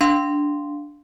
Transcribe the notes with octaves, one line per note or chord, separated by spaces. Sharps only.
D4 F5 C6